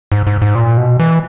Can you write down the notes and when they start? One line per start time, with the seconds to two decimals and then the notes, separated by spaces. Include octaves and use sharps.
0.12 G#2
0.27 G#2
0.42 G#2
0.55 A#2
0.77 B2
1.00 E3